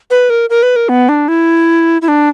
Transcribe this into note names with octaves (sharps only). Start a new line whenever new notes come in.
B4
A#4
A#4
B4
A#4
B3
D4
E4
E4
D4